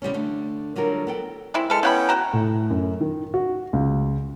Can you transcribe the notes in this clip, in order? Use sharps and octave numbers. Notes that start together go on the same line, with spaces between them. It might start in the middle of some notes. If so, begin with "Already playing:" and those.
C#3 G3 C4 C#4
D3 A3
D3 F#3 G3 F4 A#4
B3 A4 G5
G#3 C4 E4
G#3 A4 B4 F6
B3 C#4 E4 F#5 G5 B5
F#4 A#5
A2
F#2
D#3
F#4
C#2